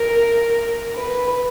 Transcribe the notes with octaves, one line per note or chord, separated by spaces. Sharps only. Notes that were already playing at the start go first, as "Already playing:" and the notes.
Already playing: A#4
B4